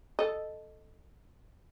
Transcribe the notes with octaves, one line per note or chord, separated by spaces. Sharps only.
A4 D#5